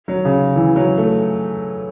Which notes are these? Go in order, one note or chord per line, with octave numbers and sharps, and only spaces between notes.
F#3
C#3
E3
F#3
A3